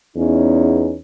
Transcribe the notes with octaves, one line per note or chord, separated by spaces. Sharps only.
E2 C#4 D#4